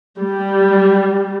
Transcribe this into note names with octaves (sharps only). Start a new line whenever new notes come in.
G3